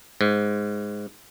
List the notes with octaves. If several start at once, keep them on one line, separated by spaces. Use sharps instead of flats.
G#2